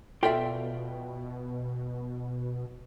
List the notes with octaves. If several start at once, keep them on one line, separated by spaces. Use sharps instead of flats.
B2 F4 A4 D5 E5 G5